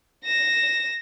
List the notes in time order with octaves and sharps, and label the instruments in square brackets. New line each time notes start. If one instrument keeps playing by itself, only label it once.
[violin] A#6 E7